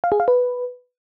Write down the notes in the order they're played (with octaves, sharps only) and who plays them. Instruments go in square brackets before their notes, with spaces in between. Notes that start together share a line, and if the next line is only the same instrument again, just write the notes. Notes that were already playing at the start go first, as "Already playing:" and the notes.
[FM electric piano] F5
G#4
F5
B4